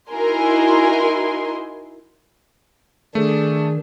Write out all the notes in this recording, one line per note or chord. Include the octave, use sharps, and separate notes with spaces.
D#4 E4 F#4 A#4 G#5 C6
D#3 A3 D4 G#4